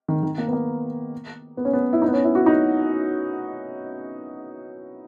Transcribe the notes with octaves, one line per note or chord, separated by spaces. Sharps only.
D#3
D#3
A#3
B3
A#3
B3
C#4
B3
E4
D#4
B3
C#4
E4
F#4
D#4